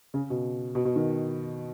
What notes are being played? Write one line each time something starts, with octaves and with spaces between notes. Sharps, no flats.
C#3
B2
B2
B2
D#3